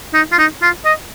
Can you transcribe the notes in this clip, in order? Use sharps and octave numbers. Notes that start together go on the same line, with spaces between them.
D#4
F4
D#4
F4
D#5